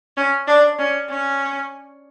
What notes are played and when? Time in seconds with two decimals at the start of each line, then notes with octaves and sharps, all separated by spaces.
0.17 C#4
0.48 D4
0.79 C#4
1.09 C#4